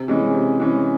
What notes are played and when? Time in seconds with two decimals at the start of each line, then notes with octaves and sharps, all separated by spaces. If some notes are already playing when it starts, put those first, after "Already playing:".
Already playing: C3
0.08 E3 G#3 C#4
0.34 C3
0.60 E3 G#3 C#4